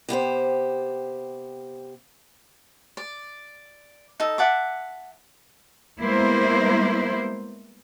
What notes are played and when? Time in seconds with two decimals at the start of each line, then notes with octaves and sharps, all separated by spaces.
0.09 C3 B3 G4 C5
2.97 D5
4.20 D#4 A4
4.38 E5 F#5 A5 D6
6.02 G3 G#3 A#3 B3 E4 C5